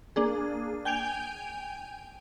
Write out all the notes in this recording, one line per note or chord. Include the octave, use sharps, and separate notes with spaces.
A#3 D4 G#4
G5 G#5 G6 D7 F7